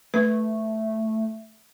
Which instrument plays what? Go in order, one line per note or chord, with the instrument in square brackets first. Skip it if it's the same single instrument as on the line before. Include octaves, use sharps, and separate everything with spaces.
[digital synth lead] A3 [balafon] B4